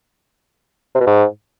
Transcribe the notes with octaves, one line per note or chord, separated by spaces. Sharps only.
C3
B2
G#2